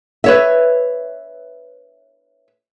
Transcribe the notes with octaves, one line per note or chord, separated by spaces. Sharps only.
B4 C#5 E5